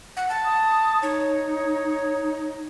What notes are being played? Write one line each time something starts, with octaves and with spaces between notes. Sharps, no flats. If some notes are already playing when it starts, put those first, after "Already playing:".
F#5
A5
D#6
D#4 C#5